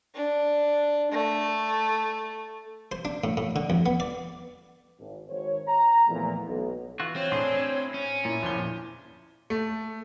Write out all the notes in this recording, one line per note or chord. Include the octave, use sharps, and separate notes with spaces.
D4
A3
C5
D4
A2
A2
D3
F2
B3
D5
G#1
G#1 C5 C#5
A#5
E2 A#2 F3 A3
B1
E3 F4 F#4
C4 C#5
A2 D4 G#4 C6
C#4
A#2 E4
G1 A#2 F3 G7
A3